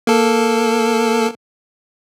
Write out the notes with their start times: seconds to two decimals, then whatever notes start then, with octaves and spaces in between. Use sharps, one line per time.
0.07 A#3 A4